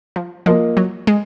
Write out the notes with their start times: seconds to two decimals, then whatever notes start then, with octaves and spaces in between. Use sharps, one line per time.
0.16 F3
0.46 F3 A#3 F4 A#4 D#5
0.77 F#3
1.07 G#3